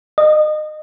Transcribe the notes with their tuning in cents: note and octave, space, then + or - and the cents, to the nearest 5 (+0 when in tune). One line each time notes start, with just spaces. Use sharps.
D#5 -30